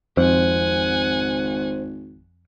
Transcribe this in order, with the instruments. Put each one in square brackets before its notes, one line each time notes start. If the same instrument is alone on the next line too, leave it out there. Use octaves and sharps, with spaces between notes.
[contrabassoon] G#1 [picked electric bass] F2 [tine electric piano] C5 [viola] F#5 G#5